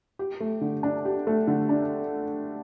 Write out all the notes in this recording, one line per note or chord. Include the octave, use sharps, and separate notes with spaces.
G4
A3
D3
D4
G4
A3
D3
D4